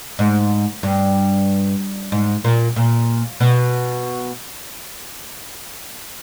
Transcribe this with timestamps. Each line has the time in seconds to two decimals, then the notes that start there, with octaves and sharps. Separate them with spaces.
0.19 G#2
0.83 G2
2.12 G#2
2.44 A#2
2.76 A#2
3.40 B2